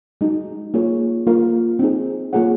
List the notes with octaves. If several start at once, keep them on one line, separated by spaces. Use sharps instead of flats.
G#3 D#4 F#4
A#3 F4 G#4 C#5
A#3 F4 A#4 F5
C4 D#4 G#4
A#3 F4 G#4 C#5 F#5